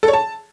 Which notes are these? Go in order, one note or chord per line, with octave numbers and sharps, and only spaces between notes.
A4
C#5
A5